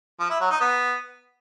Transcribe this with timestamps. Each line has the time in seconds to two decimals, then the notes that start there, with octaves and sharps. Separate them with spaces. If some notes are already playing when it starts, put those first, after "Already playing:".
0.20 F3
0.30 E4
0.40 F#3
0.51 D#4
0.61 B3